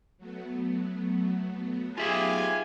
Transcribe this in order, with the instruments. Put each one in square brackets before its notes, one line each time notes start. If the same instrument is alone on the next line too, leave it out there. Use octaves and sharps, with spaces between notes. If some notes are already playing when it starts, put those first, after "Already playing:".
[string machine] F#3 A3 B3
[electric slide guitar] F4 E5 F5 [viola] G4 G#4 [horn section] G#5